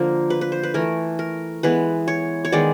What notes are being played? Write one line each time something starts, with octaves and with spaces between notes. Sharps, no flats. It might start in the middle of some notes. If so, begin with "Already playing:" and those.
Already playing: D3 F3 A#3 A#4
B4
B4
C5
B4
E3 A3 A#4
A#4
E3 G#3 B3 B4
C#5
C#5
D#3 G#3 B3 D5